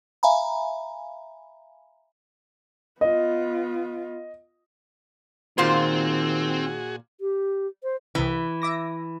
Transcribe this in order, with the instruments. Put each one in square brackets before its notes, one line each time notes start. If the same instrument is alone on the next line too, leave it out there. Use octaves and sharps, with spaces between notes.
[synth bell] E5 F5 G#5 A#5 B5
[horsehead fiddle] B3 F4 [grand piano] D#5
[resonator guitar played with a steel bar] A#2 F4 C5 [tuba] D#3 [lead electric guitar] C4 [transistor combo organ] F#4 G#4
[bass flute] G4
C5
[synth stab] C2 B5 [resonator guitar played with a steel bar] E3
[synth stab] E5 D6 A#6